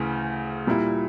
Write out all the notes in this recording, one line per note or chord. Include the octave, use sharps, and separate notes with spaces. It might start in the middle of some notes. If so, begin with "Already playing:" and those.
Already playing: D2 C#3 E3
A#2 G3 A#3 E4